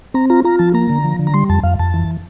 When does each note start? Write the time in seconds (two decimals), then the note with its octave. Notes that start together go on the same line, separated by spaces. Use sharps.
0.14 C4 A#5
0.30 F4 A#5
0.44 F4 A#5
0.59 F3 A5
0.74 A#3 A#5
0.90 D3
1.04 F3
1.19 D3
1.27 A#5
1.34 G3 C6
1.49 F2 A5
1.63 F2 F5
1.79 F2 A5
1.94 E3